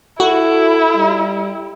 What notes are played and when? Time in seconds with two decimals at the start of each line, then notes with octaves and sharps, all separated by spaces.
0.20 E4 F#4 A4
0.96 G3